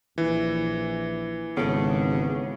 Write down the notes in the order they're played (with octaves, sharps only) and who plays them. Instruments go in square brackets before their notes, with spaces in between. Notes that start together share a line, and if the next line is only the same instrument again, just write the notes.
[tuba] A#1 [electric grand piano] E3
[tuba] G#1 [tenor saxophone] C#3 [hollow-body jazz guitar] B3 A4